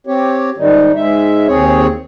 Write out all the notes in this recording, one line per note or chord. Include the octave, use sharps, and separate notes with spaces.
C4 G4 C#5
G#2 D#3 G3 D#4
G#2 G#3 E5
D#2 C4 G#4 C#5